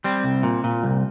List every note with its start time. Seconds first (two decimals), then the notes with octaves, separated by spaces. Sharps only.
0.04 G3 C4
0.24 C2
0.43 A#2
0.64 A#2
0.83 C2